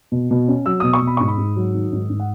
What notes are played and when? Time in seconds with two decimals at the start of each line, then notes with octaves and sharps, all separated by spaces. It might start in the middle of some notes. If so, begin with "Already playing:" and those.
0.12 B2
0.31 B2
0.48 C#4
0.66 F#3 E6
0.80 D#6
0.84 B2
0.93 C#6
1.02 B2
1.07 B5
1.17 G#2 C#6
1.28 B5
1.37 G#2
1.56 F#3
1.75 D#3
1.92 G#2
2.10 G#2
2.20 F#5